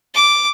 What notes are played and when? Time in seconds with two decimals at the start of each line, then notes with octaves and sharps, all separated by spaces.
0.14 D6